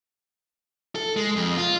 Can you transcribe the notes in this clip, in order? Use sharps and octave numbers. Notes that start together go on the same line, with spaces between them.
A4
G#3
F2
F4